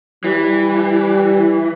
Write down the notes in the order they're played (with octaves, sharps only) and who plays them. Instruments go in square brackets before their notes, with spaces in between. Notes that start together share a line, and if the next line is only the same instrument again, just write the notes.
[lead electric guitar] E3 [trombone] G3